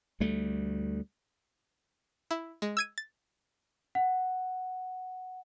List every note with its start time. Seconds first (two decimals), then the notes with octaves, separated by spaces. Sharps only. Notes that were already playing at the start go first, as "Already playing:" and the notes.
0.20 D2 G3 A3
2.31 E4
2.62 G#3
2.77 E6 G#6 D#7
2.98 A6
3.95 F#5